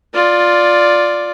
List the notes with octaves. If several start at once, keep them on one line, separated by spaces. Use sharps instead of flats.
F4 D5